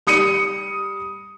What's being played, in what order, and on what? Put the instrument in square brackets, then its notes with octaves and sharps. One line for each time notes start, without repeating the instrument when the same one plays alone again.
[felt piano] G3 D#6 C#7 D#7